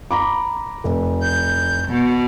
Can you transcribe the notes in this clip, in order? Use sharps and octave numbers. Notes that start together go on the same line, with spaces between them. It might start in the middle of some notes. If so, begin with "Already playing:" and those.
A#5 B5 D6
F1
G6
B2